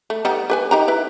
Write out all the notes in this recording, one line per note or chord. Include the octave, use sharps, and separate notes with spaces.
A3
G3 B3 D#4
G4 B4 G#5
D#4 G4 A#5
E4 B4